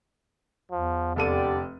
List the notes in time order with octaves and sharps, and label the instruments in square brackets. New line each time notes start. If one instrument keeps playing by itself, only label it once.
[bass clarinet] E2 [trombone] F3
[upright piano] F1 A4 D#7 [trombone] D3 [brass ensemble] G4 D5